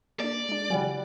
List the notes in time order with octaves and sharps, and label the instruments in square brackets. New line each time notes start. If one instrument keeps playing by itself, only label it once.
[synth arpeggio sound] A#3 D4 [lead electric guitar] D5
[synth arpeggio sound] G#3 D4
[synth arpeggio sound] C#3 E3 F#3 [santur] G3 F#5 G#5